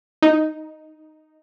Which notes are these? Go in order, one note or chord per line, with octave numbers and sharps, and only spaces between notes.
D#4